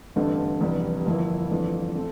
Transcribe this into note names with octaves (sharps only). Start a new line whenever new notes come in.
A1 G2 D3 A3 C4
F1 E2 C3 G3 D4
G1 F2 E3 A#3 E4
G1 F2 E3 A3 D4
A3 C4